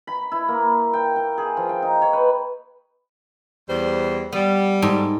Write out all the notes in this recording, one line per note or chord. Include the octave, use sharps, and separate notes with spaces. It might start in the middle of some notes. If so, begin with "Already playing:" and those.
B5
E4
A#3
G5
G5
G#4
F3
G5
D#4
C#5
B4
E2 G3 C5
G3 B3
G#2 A4